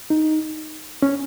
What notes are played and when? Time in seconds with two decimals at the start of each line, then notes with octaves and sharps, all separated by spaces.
0.10 D#4
1.02 C#4